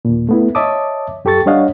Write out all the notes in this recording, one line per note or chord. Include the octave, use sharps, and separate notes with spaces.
D#2 A#2
A3 B3 E4
C#5 D#5 E5 A5 D6 D#6
F#2 G4 A4 C#6 A6
G3 D4 C#5 D#5 F5 F#5